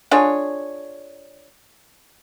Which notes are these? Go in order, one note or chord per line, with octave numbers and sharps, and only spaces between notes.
D4 F4 G#4 C#5